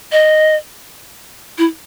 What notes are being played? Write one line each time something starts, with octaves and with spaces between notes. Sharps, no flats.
D#5
E4